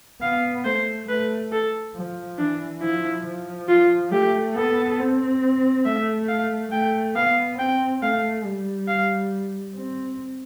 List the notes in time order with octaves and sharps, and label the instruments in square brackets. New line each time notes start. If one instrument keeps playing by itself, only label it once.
[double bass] B3 [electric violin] F5
[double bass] A3 [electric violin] C5
[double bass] A3 [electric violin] B4
[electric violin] A4
[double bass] F3
[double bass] E3 [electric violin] D4
[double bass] F3 [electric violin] E4
[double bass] F3
[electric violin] F4
[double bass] A3 [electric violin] G4
[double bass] B3 [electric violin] A4
[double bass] C4
[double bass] A3 [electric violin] E5
[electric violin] F5
[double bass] A3 [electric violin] G5
[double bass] B3 [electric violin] F5
[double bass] C4 [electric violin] G5
[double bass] A3 [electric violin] F5
[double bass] G3
[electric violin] F5
[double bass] C4